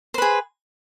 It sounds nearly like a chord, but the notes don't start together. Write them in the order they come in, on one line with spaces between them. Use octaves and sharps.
C5 B4 G#4